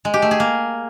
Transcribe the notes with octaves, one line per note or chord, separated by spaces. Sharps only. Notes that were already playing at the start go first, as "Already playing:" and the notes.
G#3
G4
A3
G#4
A#3